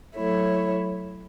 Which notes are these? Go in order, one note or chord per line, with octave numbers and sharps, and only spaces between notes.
F#3 A3 E4 C#5